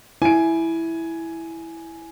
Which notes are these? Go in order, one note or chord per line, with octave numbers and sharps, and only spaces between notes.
E4 G#5 D7